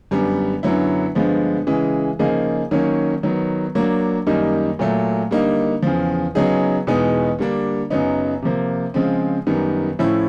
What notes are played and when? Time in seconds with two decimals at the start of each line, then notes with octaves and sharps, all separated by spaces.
0.11 F#2 D3 G3 B3
0.63 F#2 D3 F#3 B3 E4
1.15 G2 D3 F3 G#3 B3
1.67 C#3 E3 G#3
2.19 C#3 F3 A#3 D#4 G#4
2.71 D#3 F#3 A#3 C#4
3.23 D#3 F#3 B3
3.75 F#3 A#3 D4
4.26 F#2 D#3 G3 A#3 D#4
4.79 A#2 F#3 A3
5.31 D3 G3 A#3 D#4
5.82 E2 C#3 F3
6.35 C#3 F#3 B3 D#4 G#4
6.87 E2 B2 G#3 B3 D#4
7.39 D3 G3 A#3 D4
7.90 F#2 C#3 F#3 B3 D#4
8.42 C3 F3 A#3
8.94 C#3 F3 G#3 C4
9.47 F#2 D#3 G3 B3
9.99 A2 F3 A3 C#4 E4